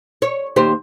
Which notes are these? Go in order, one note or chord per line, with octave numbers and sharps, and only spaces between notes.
C#5
D#2 G4 C5